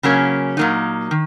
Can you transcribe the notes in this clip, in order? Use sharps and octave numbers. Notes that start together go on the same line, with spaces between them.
C#3 F#3 A#3 C#4
A#2 F#3 A#3 D#4
D#3